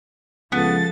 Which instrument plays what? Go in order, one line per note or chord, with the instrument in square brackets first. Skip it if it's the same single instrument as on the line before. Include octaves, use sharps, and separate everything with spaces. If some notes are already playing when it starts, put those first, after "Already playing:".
[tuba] C#2 [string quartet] F3 A4 A6 [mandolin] B3